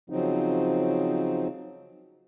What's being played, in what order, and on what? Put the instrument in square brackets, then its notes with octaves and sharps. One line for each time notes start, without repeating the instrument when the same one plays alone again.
[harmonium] C#3 F3 F#3 C4 D#4